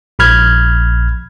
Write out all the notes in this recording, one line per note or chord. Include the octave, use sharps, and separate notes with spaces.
A#1 B5 F6 G#6